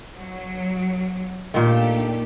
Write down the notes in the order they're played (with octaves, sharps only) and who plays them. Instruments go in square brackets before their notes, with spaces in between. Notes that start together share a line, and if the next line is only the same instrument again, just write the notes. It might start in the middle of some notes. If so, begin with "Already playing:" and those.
[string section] F#3
[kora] A#2 D#3 [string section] A3 D4 G4